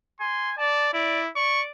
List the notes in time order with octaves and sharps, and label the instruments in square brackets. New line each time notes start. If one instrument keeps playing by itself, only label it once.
[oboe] G#5 [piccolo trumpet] C6
[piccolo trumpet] D5 [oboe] A5
[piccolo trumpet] E4 [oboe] D5
[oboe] D5 [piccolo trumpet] C#6